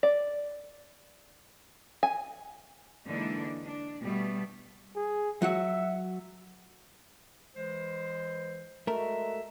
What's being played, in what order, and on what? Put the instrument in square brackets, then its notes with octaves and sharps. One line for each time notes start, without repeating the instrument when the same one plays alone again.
[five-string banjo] D5
G#5
[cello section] D3 E3 G#3 A#3 D4 D#4
D4
B2 G3 A3 B3
[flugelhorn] G#4
[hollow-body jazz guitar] F#3 F#4 F#5 [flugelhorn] E5
[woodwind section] E3 G#3 C5
[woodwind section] G#3 F#4 E5 [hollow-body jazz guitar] A3 A#4